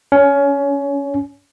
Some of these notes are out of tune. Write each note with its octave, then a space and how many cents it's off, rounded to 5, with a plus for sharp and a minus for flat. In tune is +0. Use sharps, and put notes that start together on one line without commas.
C#4 +20